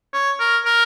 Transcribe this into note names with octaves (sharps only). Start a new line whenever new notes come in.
C#5
A#4
A#4